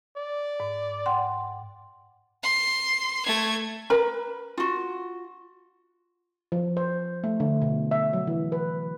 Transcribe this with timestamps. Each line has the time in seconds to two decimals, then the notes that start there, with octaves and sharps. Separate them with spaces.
0.17 D5
0.60 G#2
1.06 F#5 G5 C6
2.43 C6
3.26 A3 G#6
3.90 A#4 B4 B5
4.58 F4 F#4
6.52 F3
6.77 C5
7.24 A3
7.40 D3
7.62 B2
7.91 E5
8.13 F#3
8.27 E3
8.52 B4